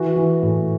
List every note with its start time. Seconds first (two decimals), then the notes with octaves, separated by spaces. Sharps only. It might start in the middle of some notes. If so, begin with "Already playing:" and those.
Already playing: E3 F#4
0.16 E3
0.43 A2